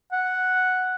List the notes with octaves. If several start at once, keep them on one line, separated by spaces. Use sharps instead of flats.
F#5